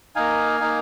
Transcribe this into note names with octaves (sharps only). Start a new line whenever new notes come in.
A#3 D#4 F5 G#5
A#3 D#4